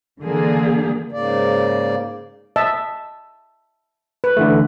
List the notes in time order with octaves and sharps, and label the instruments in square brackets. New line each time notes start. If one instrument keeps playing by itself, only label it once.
[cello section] D3 E3 A#3 G#4
[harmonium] G#2 C#3 A#3 D5
[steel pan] D#5 E5 A5
B4
[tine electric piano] D3 E3 A3